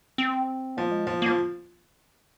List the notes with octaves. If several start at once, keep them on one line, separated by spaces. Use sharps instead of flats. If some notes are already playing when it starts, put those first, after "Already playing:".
C4
F3 A#3
G#3
F3 A#3
F3 A#3